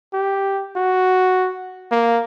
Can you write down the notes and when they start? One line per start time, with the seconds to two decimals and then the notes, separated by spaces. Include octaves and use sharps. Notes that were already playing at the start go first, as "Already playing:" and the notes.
0.13 G4
0.76 F#4
1.91 A#3